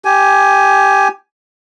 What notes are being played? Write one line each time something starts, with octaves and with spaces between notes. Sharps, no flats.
G4 G#5